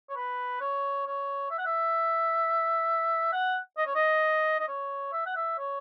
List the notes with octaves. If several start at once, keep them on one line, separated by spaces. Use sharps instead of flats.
C#5
B4
C#5
C#5
E5
F#5
E5
F#5
D#5
C#5
D#5
D#5
C#5
E5
F#5
E5
C#5